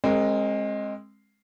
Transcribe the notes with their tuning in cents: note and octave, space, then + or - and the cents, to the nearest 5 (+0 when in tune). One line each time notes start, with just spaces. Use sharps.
G#3 +0 C4 +35 A#4 +0